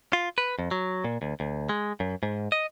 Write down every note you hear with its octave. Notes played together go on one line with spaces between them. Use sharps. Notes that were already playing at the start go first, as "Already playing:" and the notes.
F4
B4
F2
F#3
A#2
D2
D2
G#3
F#2
G#2
D#5